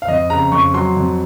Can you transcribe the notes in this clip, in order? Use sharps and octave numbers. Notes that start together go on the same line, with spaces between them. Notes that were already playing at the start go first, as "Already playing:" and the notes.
F5
F2 D#5
C#3 A#5
F2 C#6
F#3 C6
F2